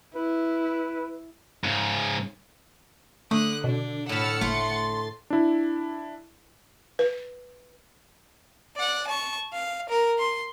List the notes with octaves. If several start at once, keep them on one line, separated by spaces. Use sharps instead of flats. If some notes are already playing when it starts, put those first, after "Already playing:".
E4 B4
G#2 C#3
D3 A3 D#6 F#6
B2 D4
A2 F#5 B5 E6 F6 A6 C#7
F#1 A3 C6 A6
D4 E4
B4
D5 F#5
A5 C#6
F5
A#4
C6